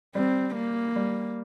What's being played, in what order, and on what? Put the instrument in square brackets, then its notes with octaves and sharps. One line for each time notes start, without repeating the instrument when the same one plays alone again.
[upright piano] G3 [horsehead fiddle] C4
[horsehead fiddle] A#3
[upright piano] G3